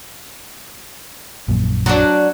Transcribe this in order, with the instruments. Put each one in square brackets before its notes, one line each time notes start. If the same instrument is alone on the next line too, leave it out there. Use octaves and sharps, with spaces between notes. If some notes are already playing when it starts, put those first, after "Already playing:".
[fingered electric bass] A#1 F#2 A#2
[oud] F#3 D4